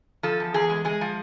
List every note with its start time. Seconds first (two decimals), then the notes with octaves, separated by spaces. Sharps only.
0.23 F3 A4
0.40 E2
0.54 E2 G#4
0.69 G#3
0.85 G#3 G#4
1.01 F3